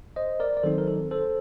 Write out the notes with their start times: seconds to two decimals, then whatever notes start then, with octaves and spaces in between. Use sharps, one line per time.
0.16 C5 D#5
0.40 A#4 D5
0.57 D5
0.63 D#3 F#3 C4 D#4 A4 C5
0.78 A#4
0.87 A4
1.11 A4 C5